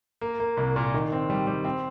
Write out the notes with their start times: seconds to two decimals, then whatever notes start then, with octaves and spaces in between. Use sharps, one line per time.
0.21 A#3
0.40 A#3
0.57 C2
0.76 A#2
0.94 D#3
1.12 C4
1.30 G3
1.47 G3
1.65 C4